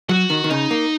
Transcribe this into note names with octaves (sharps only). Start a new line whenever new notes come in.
F#3 F#4
D#3
D#3
C#3 D#4
A#3